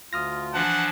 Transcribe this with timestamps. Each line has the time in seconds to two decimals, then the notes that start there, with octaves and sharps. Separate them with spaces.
0.13 D2 F4 D#6 F6 A#6
0.54 E3 F3 D4 F#5 A5